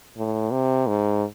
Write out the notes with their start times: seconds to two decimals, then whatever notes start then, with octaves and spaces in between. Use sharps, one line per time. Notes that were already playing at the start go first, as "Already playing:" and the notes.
0.17 A2
0.52 C3
0.87 G#2